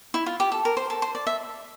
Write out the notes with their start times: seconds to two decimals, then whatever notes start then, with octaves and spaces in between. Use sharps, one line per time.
0.14 E4
0.26 F4
0.40 G4
0.52 A4
0.65 A#4
0.77 C5
0.90 A4
1.02 C5
1.15 D5
1.27 E5